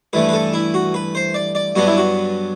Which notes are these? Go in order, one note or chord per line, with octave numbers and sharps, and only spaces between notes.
G2 E3 A3 B4
B4
A4
E4
F#4
B4
C5
D5
D5
G2 F#3 B3 D4 F#4
E4
F#4